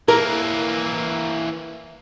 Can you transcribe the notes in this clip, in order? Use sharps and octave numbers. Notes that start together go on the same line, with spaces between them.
E3 A#3 A#4